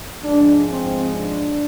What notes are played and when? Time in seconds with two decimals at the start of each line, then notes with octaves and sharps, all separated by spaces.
0.22 G#2 F3 G#3 D4
0.67 C4
1.10 D4